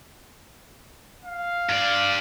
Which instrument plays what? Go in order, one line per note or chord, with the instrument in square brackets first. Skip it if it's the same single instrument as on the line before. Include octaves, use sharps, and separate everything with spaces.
[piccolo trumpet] F5
[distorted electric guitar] G2 D5